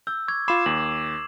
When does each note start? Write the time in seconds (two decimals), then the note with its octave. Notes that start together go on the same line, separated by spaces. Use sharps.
0.07 E6 G6
0.28 C#6 D6 G#6
0.48 F4 B5 D6 C7 E7
0.66 D#2 F#7